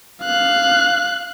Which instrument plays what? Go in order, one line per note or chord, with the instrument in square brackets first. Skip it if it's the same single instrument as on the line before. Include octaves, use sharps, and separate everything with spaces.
[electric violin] F5 F#6